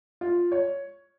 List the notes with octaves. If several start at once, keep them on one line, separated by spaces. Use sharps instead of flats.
F4
C#5